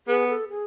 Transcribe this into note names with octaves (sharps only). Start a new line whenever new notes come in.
B3 G#4
A4
G#4